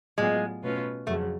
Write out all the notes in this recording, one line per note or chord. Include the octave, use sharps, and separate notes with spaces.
A2 F#3 G#3 B3 F4 G#4
B2 A3 C#4 F4 B4
F2 C#3 F#3 A3